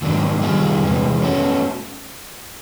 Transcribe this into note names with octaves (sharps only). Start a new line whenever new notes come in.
G#2 D#3 F#3 A#3 D4
D#3 G3 C4 F4 G#4
E2 C3 E3 G#3
A3 C#4 F#4